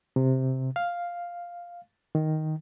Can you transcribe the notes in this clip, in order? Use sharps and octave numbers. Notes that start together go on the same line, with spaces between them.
C3
F5
D#3